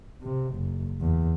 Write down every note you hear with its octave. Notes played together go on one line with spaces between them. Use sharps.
C3
F#1
E2